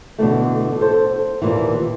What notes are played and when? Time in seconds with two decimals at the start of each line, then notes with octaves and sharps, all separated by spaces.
0.19 B2 D3 E3 A3
0.81 A4 C5
1.42 D#2 A#2 E3